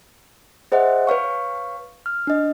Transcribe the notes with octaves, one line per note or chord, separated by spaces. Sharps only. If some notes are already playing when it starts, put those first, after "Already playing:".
G#4 C5 D#5 E5 F#5
B4 C#5 F5 C#6
F6
D4 D#5